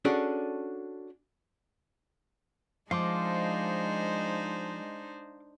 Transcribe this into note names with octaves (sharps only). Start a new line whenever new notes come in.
C#4 D4 F#4 G#4 A4 D5
F3 G#3 D4 D#4 C5 F5 C6 D6